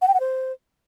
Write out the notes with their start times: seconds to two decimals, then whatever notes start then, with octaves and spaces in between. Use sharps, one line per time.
0.02 F#5
0.08 G5
0.14 F#5
0.20 C5